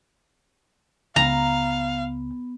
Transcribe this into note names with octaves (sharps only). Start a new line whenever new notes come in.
C#2 B3 F5 A#5